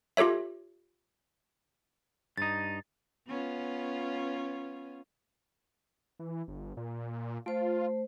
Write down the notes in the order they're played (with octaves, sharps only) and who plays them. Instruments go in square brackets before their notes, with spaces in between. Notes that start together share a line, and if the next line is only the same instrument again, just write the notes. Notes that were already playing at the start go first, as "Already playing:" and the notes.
[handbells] F4 G4 A4 C#5 E5
[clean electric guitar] G2 D#4 [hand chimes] A6
[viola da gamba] B3 C#4 F4
[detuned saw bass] E3
G1
A#2
[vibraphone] A3 C5 [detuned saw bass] F4